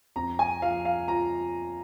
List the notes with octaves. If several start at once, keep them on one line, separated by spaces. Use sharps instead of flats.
F2 A#5
G#5
F3 F5
F5
F4 A#5